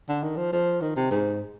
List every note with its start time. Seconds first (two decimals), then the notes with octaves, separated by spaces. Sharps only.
0.09 D3
0.23 D#3
0.37 F3
0.52 F3
0.81 D#3
0.96 C3
1.11 G#2